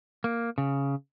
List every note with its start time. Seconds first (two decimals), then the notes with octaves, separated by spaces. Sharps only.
0.24 A#3
0.58 C#3